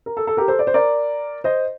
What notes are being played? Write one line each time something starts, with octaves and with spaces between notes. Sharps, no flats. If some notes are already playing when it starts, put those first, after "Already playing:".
A#4
A4
A4
G4 A#4
A4 C5
D5
C5
A#4 D5
C5 D#5